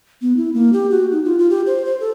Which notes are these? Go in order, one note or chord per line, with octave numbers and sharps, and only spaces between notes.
B3
E4
A#3
G4
F#4
D#4
F4
F4
G4
C5
C5
A4